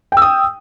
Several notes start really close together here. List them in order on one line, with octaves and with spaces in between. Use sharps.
G5 E6 D#6